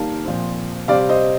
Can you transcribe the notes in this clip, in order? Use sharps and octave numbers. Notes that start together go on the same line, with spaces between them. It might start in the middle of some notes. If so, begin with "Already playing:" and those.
Already playing: D#3 G3 A#3 F5 A5
A#2 F3 C4
C3 G3 C4 D5 F5
C5 D#5